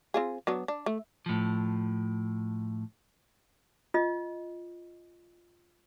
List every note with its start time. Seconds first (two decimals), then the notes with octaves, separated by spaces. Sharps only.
0.14 C4 F4 G#4
0.47 F#3 B3 D4
0.68 D4
0.86 A3
1.26 A2 F3
3.94 F4 D#5